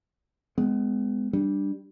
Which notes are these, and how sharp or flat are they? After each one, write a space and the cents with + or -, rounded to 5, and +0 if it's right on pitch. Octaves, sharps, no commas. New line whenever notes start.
G#3 +0 B3 +30
G3 +0 D4 +5